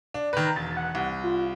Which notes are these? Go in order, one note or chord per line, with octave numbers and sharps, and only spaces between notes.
D4
D#3 B4 A#5
E1 A6
F#5
C2
F4